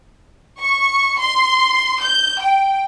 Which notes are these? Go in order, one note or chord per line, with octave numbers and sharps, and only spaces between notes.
C#6
C6
G6
G5